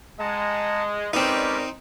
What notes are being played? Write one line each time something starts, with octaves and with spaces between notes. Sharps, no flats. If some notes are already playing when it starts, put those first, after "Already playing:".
G#3 D#5 F#5 A5 A#5
G#3 C4 C#4 D#4 G4 A#4 B4 D5